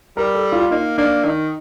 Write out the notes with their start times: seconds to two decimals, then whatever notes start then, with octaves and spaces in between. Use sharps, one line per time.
0.17 G3 A#4
0.35 A4
0.52 F4
0.71 A#3 D#4
0.98 A#3 D4
1.25 D#3 D#4